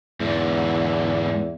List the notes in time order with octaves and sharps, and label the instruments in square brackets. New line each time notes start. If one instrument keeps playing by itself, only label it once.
[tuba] E2 [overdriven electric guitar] G#2 D3